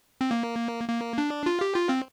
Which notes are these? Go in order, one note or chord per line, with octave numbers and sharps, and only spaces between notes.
C4
A#3
A#3
D4
F4
G4
F4
C4